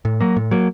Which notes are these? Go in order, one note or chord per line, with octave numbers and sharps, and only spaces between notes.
A2
F#3 A#3
A2
F#3 A#3